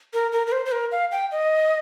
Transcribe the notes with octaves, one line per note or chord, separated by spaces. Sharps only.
A#4
A#4
A#4
C5
C5
A#4
F5
G5
D#5